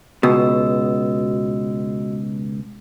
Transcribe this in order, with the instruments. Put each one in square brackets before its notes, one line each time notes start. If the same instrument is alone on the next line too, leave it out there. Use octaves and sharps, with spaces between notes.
[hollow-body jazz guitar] C#2 B2 [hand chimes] F#4 D#5 E6